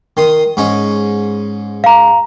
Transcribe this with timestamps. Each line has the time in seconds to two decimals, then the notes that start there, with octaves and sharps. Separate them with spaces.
0.17 D#3 C6 D#6
0.57 G#2 C#4 D#4
1.84 F5 A#5